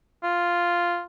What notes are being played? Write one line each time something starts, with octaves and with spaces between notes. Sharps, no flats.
F4